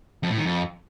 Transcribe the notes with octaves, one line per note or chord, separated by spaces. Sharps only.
F2
A2
D#3
F2